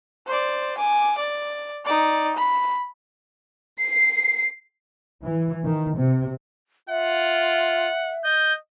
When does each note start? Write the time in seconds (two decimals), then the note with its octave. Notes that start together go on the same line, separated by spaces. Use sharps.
0.26 C5 D5
0.78 G#5 D6
1.18 D5
1.85 D#4 D5
2.37 B5
3.82 C7
5.24 E3
5.64 D#3
5.96 C3
6.89 F4 E5 F#5
8.24 D#5 G6